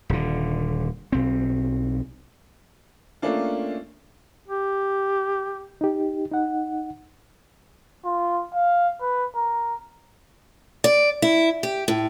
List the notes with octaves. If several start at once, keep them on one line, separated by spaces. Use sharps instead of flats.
D#1 D3
B1 C4
A3 A#3 C#4 D4 F4
G4
D#4 G4
D#4 F#5
F4
F5
B4
A#4
D5
E4
G4
A2